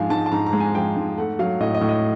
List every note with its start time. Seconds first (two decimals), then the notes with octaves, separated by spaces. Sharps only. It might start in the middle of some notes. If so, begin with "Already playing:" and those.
Already playing: G#2 F3 G#3 F5 G#5
0.10 G#2 A5
0.26 A5
0.32 G#2 A#5
0.46 A#5
0.53 G#3
0.60 G#5
0.75 F3 G5
0.97 G#2
1.17 A3 F#5
1.39 F#3 F5
1.60 A2 D#5
1.75 D#5
1.81 A2
1.89 D#5